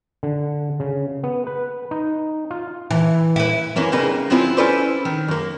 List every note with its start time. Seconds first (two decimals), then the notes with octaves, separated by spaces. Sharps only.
0.23 D3
0.80 C#3
1.24 B3
1.47 B4
1.91 D#4
2.51 F4
2.91 E3
3.36 E4 B4
3.76 F#2 E3 A#3 C#4
3.92 C#3 G3 A#3 D#4 B4
4.30 G2 F3 C4 C#4 E4 F4
4.57 C#4 E4 A4 B4 C5 D5
5.05 D#3
5.28 F#2 A#3